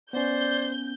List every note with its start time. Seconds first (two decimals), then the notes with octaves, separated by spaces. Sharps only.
0.13 B3 C#4 C5 D5 G6